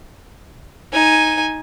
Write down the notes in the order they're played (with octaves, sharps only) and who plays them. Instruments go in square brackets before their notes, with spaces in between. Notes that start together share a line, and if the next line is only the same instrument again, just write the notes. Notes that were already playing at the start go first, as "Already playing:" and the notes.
[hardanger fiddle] D#4 G#5